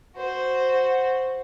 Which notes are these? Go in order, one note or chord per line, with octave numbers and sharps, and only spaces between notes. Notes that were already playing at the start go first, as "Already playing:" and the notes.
F#4 C5